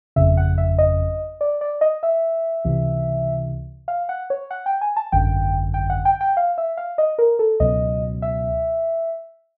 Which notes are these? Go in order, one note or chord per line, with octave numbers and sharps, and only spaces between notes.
G1 F2 C#3 E5
F#5
E5
D#5
D5
D5
D#5
E5
C#2 C3 E3
F5
F#5
C#5
F#5
G5
G#5
A5
G#1 F#2 D3 G5
G5
F#5
G5
G5
F5
E5
F5
D#5
A#4
A4
C#2 B2 F#3 D#5
E5